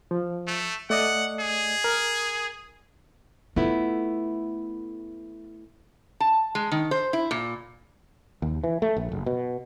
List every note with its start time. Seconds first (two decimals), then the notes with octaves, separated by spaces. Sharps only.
0.11 F3
0.47 A3
0.90 A3 D5 D#5 F#5
1.40 G#4
1.84 A#4
3.56 A3 B3 E4 F4
6.20 A5
6.55 G#3
6.72 D#3
6.91 C5
7.13 E4
7.31 A#2
8.42 D#2
8.64 E3
8.82 A3
8.97 A#1
9.12 F#1
9.26 B2